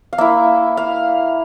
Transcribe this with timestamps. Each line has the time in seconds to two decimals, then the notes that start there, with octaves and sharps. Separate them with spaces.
0.13 F5
0.18 A#3 E4 E5
0.77 F5